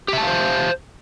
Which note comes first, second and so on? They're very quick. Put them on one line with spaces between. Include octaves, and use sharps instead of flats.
G4 E5 A5 F5 C5